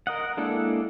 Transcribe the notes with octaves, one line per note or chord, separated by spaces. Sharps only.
A#4 D#5 F#5
G#3 A#3 D4 E4 A4